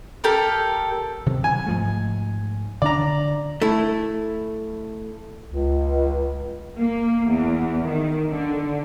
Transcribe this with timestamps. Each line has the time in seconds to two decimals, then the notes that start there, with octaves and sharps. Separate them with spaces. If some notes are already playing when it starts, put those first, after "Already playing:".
0.24 G4 A4 A#4
1.26 C3 D#3 F#3
1.44 G#5
1.67 G#2 F3 A3
2.82 D3 D4 D5 A#5
3.62 A3 E4
5.46 C#2
6.80 A#3
7.30 E2
7.89 D#3
8.32 D3